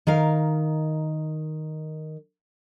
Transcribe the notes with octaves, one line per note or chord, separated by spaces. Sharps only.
D#3 A#4 F5